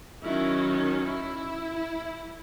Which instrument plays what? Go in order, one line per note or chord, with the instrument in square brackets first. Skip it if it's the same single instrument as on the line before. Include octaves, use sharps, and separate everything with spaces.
[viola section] D#3 F#3 C#4 E4
E4